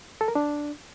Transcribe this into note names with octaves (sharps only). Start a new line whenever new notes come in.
A4
A#4
D4